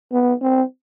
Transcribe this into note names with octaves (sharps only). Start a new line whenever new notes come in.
B3
C4